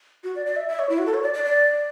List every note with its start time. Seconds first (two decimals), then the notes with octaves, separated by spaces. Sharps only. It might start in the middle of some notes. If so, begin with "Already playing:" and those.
0.24 F#4
0.36 D5
0.46 D5
0.56 E5
0.68 E5
0.79 C#5
0.90 E4
0.99 F#4
1.06 A4
1.14 C#5
1.23 D5
1.34 D5
1.45 D5